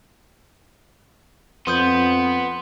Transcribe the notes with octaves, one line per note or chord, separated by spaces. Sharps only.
F2 B3 C6 D#6 G6